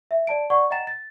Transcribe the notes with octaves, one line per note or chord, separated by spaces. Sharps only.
E5
D5 A5 D7
D5 F#5 C#6
D#5 F#5 G5 A#5 A6 E7
A6